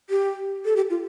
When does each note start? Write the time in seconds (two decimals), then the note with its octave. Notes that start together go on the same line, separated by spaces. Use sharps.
0.10 G4
0.65 A4
0.76 G4
0.90 F4